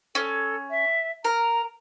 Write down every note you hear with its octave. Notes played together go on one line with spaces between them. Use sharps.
C#4 A4
E5
A#4 A#5